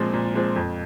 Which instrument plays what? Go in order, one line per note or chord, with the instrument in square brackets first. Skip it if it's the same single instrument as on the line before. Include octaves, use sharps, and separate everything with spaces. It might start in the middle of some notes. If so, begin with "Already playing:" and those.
Already playing: [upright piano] A#2 F3 G#3 C4
A#2
F3 G#3 C4
F2